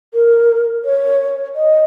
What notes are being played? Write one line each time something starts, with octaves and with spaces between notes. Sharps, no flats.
A#4
C#5
D#5